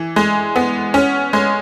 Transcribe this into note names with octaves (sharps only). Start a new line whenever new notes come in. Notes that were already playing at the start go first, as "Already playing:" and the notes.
Already playing: E3
G#3
B3
C#4
G#3